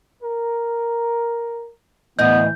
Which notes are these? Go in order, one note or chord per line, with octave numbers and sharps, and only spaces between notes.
A#4
D2 A2 E3 B3 D#5 G6